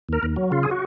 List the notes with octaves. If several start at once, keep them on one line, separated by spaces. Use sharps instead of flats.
D#2 A#4
D#2
F#3
C#3 F4
G#4
F#4